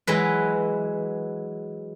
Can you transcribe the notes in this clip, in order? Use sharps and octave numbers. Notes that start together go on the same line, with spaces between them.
E3 F#3 G#3 B4